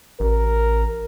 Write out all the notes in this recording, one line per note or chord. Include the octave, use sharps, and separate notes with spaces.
A1 A#4